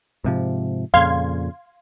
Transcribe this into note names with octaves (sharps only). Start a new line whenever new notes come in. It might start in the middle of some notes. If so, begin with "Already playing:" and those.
G#2 C3 F3
F2 A#2 C#3 F5 C6 G#6